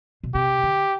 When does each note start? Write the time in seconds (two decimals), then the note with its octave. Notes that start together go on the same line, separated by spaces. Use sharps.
0.24 B2
0.35 C3 G4
0.63 D3